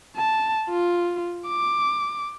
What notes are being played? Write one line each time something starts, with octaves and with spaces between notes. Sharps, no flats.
A5
F4
D6